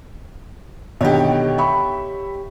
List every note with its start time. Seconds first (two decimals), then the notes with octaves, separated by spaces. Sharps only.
1.01 B2 D3 D#3 G4 C#5
1.58 E5 B5 C#6